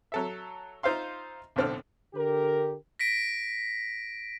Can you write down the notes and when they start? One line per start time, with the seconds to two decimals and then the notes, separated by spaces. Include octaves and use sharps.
0.12 F#3 A4 E5
0.83 D#4 F4 C5 E5 F5 C6
1.56 B1 A2 D3 C4 A4 F6
2.14 D3 G4 A#4
2.99 A#6 B6 D7